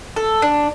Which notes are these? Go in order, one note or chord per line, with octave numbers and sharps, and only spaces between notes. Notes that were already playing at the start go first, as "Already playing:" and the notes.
A4
D4